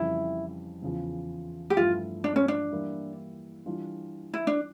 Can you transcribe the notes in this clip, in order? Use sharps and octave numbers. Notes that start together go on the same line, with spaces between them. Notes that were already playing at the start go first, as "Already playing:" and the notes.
Already playing: F2 C#3 E3 G3 E4
E2 C#3 F3
G4
G2 F3 A3 E4 F4
D4
C#4
D4
E3 G3 A#3 E4
E3 G3 D4 F4
E4
D4